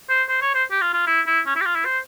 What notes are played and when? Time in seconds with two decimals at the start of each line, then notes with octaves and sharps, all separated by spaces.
0.09 C5
0.29 C5
0.42 C#5
0.55 C5
0.71 G4
0.81 F4
0.94 F4
1.07 E4
1.27 E4
1.46 C#4
1.56 E4
1.61 G4
1.66 F4
1.75 E4
1.85 C5